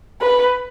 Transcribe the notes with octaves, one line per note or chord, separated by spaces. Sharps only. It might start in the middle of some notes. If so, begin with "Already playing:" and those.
B4